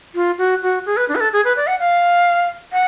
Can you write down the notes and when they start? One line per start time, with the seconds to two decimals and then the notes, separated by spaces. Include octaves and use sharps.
0.15 F4
0.38 F#4
0.62 F#4
0.86 G#4
0.97 B4
1.09 D4
1.15 B4
1.20 A4
1.33 G#4
1.45 B4
1.57 D5
1.67 F#5
1.80 F5
2.73 F#5